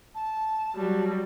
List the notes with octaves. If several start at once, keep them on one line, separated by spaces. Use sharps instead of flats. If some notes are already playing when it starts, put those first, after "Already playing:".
A5
F#3 G3